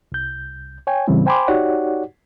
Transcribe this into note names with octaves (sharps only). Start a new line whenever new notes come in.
C2 G6
C#5 G5 G#5
A2 C#3 E3 G3 C4
C5 G5 G#5 B5 C6 D6
D#4 F#4 G4 C#5 D5 F#5